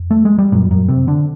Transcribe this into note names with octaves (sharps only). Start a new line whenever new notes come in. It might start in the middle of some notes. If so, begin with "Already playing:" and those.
Already playing: F2
A3
G#3
G3
F#2 A#2 F#3
F#2 F#3
C3 C4
D3 D4